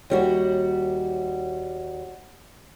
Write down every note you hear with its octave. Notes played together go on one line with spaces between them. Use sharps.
D#2 G3 F#4